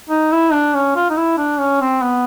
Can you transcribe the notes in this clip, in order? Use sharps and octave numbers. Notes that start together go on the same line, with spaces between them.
D#4
E4
D4
C#4
F4
D#4
E4
D4
C#4
C4
B3